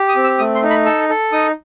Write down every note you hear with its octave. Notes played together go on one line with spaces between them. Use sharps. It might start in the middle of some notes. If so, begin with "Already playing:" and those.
Already playing: G4
D#6
C4
E6
A3 D#6
C6
D#4
B5
A4 E6
A4
D#4 D#6